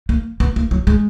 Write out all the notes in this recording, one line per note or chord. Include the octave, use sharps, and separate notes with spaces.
A#3
B3
A#3
F#3
G#3